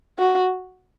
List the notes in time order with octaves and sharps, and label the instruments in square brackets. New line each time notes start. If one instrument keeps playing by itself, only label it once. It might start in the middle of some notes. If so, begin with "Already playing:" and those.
[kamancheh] F#4